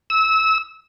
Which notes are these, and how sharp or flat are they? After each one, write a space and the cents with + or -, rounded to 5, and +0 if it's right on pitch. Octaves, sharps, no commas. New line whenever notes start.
E6 -25